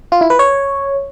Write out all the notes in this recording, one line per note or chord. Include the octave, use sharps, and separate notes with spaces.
F4
E4
B4
C#5